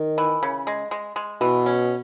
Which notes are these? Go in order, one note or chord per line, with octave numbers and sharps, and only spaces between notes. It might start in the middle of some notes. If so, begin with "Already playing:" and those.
Already playing: D#3
E3
C#3
G#3
G#3
G#3
B2 E3
C#4